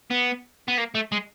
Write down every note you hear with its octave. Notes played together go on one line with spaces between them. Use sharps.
B3
B3
A#3
A3
G#3